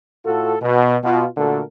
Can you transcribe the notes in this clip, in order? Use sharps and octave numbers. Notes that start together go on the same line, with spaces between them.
A2 F4 F#4 A4
B2
B2 F4
A#2 D3 A3 F#4 A4 A#4